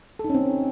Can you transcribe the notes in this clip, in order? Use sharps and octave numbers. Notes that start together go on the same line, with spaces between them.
A4
D#4
C#4
C4